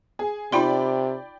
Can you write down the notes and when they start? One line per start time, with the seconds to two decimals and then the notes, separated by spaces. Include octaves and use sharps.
0.19 G#4
0.52 C3 D#4 F4 D5 G5 B5 C6